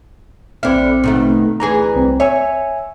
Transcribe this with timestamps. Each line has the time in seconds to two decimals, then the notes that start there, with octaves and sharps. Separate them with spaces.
0.63 A#1 D3 C4 E4 F6
1.04 B2 D#3 A3
1.60 D2 E3 G#4 A#5
1.95 C2 C4
2.20 C#5 E5 G#5 E6